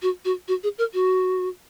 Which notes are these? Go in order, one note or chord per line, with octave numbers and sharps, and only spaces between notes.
F#4
F#4
F#4
G#4
A#4
F#4